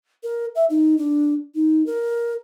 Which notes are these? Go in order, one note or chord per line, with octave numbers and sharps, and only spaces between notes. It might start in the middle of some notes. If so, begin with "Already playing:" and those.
A#4
E5
D#4
D4
D#4
A#4